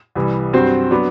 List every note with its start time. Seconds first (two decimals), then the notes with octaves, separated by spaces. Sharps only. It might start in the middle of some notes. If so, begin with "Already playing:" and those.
0.15 C2 C3 E3 G3
0.53 G2 F#3 C4 F#4 C5
0.91 F#3 B3 D4